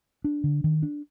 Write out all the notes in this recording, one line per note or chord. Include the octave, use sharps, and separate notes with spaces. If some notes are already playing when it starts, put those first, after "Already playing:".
D4
D3
D#3
D4